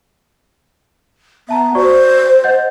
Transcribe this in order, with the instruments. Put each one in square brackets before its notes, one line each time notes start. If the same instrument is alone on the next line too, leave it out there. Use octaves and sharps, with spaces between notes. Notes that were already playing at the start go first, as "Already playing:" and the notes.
[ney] B3 [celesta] E5 A5 A#5
[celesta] F#4 D5 C#6 [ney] C5
[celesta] D#5 F#5 G6